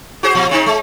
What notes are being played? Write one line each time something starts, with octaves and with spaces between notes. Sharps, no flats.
F#4 G#4 C5
A#2 F3
C#3 C4 D#4
G#3